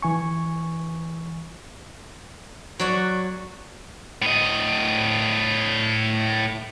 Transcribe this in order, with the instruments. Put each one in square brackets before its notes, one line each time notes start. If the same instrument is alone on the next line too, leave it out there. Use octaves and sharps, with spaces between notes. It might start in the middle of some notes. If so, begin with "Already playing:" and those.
[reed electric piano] E3 G#5 C#6
[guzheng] F#3 D5 F#5 [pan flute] C#6
[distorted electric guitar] A2 D#5